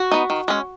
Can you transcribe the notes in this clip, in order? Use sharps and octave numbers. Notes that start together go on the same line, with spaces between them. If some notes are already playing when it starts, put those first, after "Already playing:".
Already playing: F#4
B3 D#4
D#3
G#3 C#4